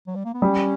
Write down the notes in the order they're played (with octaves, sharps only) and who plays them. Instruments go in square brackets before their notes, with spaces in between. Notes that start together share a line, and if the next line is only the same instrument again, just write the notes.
[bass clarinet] F#3
G3
A#3
B3
[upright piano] G3 [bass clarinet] C#4